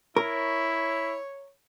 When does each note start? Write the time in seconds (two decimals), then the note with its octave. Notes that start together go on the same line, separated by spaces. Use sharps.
0.17 E4 A#4 C#5